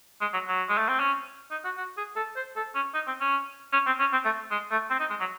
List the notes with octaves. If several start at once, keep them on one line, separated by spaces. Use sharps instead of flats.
G#3
F#3
F#3
G#3
A3
C4
C#4
D#4
F#4
F#4
G#4
A4
C5
A4
C#4
D#4
C4
C#4
C#4
C4
C#4
C4
A3
G#3
A3
C4
D#4
G#3
F#3